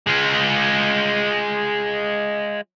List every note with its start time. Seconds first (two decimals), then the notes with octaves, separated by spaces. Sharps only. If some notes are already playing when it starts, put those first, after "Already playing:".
0.07 G#3 F4